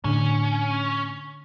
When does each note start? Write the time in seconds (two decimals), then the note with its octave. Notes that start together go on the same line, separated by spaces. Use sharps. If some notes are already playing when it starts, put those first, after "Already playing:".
0.04 A2 D3 A3 C#4 D4